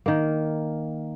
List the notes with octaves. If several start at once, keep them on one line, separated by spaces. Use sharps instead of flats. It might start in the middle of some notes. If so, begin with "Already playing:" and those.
D#3 A#3